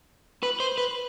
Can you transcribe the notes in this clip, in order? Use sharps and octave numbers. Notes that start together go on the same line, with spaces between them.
B4
C5
B4